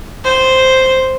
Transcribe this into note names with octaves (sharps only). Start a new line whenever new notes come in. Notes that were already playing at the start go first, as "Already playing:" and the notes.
C5